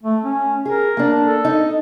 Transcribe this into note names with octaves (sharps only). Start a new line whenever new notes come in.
A3
C#4
G#4 A#4
A#3 D4
A4
D#4